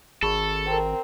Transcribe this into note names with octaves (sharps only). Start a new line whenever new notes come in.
G#1 G#4 A4 B5 C#6
C4 A#4